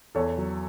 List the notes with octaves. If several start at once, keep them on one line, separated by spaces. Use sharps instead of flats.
E2 A4 C#5
F#3